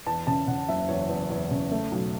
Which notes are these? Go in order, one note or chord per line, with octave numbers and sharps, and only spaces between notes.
E2 A5
C#3 A5
C#3 F#5
F#1 E5
E2 C#5
E2
E2
C#3
A3
B1